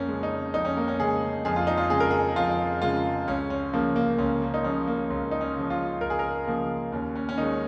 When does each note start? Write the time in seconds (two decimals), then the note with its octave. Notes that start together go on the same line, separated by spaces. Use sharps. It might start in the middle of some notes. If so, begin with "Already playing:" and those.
Already playing: F2 A#3 C#4
0.09 C#3 G#3
0.23 D#4
0.54 F2 D#4
0.65 C#4
0.77 A#3
0.88 C#4
1.00 C#3 G#3 G#4
1.45 F2 G#4
1.56 F4
1.67 D#4
1.77 F4
1.90 C#3 G#3 G#4
2.00 A#4
2.11 G#4
2.36 F2 F4
2.82 C#3 G#3 F4
3.27 C#2 C#4
3.50 C#4
3.73 C#3 F3 A#3
3.96 A#3
4.18 C#2 C#4
4.42 A#3
4.54 D#4
4.64 C#3 F3 C#4
4.87 A#3
5.10 C#2 C#4
5.31 D#4
5.41 C#4
5.56 C#3 F3
5.70 F4
6.01 C#2 A#4
6.10 G#4
6.19 A#4
6.47 C#3 F3 A#3
6.92 D#2 C#4
7.15 C#4
7.29 C#4
7.38 D#3 G#3 D#4